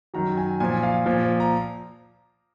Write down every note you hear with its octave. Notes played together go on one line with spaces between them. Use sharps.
F#2 D#3 F#3 A#5
G#5
A#2 F3 G#5
F5
A#2 F3
A#5